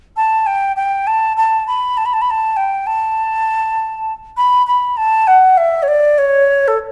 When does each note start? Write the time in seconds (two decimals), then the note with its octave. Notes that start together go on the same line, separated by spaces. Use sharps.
0.16 A5
0.46 G5
0.76 G5
1.07 A5
1.37 A5
1.67 B5
1.97 A5
2.05 B5
2.13 A5
2.21 B5
2.30 A5
2.56 G5
2.86 A5
4.36 B5
4.66 B5
4.97 A5
5.27 F#5
5.57 E5
5.82 C#5
5.88 D5
6.18 C#5
6.67 A4